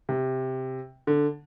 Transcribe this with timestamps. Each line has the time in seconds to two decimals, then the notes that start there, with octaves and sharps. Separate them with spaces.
0.09 C3
1.07 D3